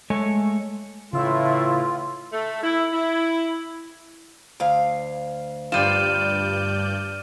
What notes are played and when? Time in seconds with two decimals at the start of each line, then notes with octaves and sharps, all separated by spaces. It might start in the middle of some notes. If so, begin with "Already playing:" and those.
0.10 G#3 A3 A4 C#5 D#5 G#5
1.13 A2 C#3 E3 E4 F4 E6
2.33 A3
2.63 E4
2.93 E4
4.60 D2 F5
5.72 G2 G3 F4 D5 F6 G6 D#7 E7